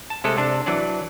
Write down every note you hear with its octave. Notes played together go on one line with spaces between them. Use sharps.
A5
C3 G#3 A3 A4
C3 D4
E3 F#3 D4 D5